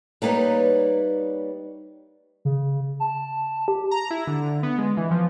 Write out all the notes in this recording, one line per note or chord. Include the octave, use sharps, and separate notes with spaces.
G3 A#3 D#4 B4 C#5
C#3
A5
G4
A#5
E4
D3
B3
G#3
E3
F3